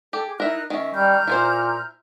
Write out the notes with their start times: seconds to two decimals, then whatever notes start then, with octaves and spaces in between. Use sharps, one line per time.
0.13 G4 A4
0.28 G#4
0.40 D#4 E4 A#4 E5 F#6
0.70 D#3 C#4 E5
0.94 G3 A#5 F6 G6
1.27 A#2 E4 F4 C5